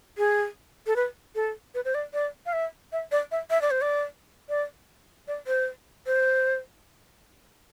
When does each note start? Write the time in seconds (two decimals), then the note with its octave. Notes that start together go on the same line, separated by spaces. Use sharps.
0.18 G#4
0.87 A4
0.96 B4
1.35 A4
1.75 B4
1.85 C5
1.95 D5
2.14 D5
2.46 F5
2.53 E5
2.92 E5
3.12 D5
3.32 E5
3.50 E5
3.62 D5
3.71 C5
3.82 D5
4.49 D5
5.28 D5
5.47 C5
6.07 C5